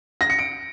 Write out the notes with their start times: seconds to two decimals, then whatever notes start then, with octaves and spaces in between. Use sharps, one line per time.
0.21 A#6
0.30 C#7
0.39 D7